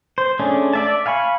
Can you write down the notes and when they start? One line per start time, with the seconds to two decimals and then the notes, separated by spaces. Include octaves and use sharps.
0.18 C5
0.39 A3 C#4 D4 G#4
0.73 D5 E5 A5
1.06 F5 G#5 B5 C#6